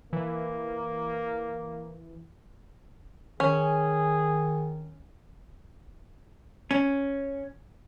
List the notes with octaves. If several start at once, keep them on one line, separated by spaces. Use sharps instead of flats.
E3 A#3
D#3 C#4 G#4
C#4